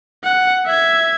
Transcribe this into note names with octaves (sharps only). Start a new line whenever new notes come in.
F#5
E5 G#6